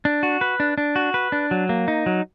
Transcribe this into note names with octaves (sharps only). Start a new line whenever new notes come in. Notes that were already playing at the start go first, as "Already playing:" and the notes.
D4
F#4
B4
D4
D4
F#4
B4
D4
F#3
A#3
D#4
F#3